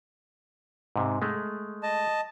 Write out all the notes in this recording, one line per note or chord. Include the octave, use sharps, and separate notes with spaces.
G#2 C3
G#3 A3
D#5 A5